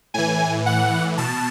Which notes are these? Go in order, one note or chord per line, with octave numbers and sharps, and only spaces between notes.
A2 E3 G#5
F#5
B2 A5